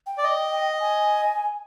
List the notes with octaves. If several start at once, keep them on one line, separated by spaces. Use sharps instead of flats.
G5
D5
D#5
G#5